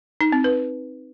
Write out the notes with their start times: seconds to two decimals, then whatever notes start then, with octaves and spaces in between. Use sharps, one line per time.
0.21 D#4
0.32 C4
0.44 B4